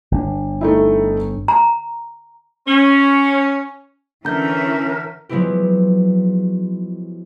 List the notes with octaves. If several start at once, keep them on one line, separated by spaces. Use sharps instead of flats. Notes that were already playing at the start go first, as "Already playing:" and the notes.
G1 C3 D4
A3 D#4 E4
A#5
C#4
D3 E3 C#4 A#4 E5 A#5 G6
F3 F#3 G#3 B3 E4 G4